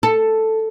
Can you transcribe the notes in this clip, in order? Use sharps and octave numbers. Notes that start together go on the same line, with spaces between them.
A4